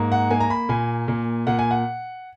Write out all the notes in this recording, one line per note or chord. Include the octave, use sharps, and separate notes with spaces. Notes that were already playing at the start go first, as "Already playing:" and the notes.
Already playing: G#2 A#3
F#5
A#3 G#5
A#5
B5
A#2 G#5
A#2
A#2 F#5
G#5
F#5